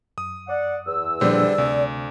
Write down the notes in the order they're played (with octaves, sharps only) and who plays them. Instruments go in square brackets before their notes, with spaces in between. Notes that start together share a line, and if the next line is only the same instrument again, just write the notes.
[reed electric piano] F#2 [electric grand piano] D#6
[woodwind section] D5 F#5
E2 E6
[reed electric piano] A#2 F3 D4 [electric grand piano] D3 G3 C5 [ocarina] D5
[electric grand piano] D2 [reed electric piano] C3